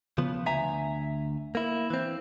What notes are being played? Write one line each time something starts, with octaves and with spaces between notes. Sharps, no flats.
C#3 F3 B3
D2 E5 G#5 A#5
A#3 E4
E3 C4